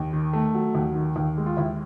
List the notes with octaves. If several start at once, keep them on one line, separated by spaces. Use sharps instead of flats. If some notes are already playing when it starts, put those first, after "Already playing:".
Already playing: D#2
D#3
A3
F#3
D#2
D#3
D#2
G#3
F4
D#2 E4